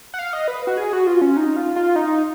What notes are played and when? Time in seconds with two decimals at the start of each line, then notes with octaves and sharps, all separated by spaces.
0.14 F#5
0.19 F5
0.33 D#5
0.48 B4
0.67 F#4
0.77 G#4
0.93 F#4
1.07 F4
1.21 C#4
1.37 D#4
1.56 F4
1.76 F4
1.96 D#4